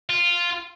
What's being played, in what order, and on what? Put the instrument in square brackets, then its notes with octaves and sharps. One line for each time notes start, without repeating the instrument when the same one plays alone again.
[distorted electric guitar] F4